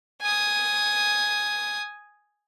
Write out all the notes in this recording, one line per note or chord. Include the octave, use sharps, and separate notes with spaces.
G#5 D#6